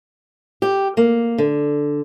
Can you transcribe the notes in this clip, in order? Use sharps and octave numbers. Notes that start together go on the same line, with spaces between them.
G4
A#3
D3